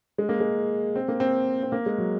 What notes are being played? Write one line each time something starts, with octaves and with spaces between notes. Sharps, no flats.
G#3
A#3
G#3
C4
A#3
C4
C4
A#3
G#3
F#3